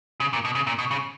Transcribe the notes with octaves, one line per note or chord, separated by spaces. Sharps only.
C#3
A#2
B2
C#3
A#2
B2
C#3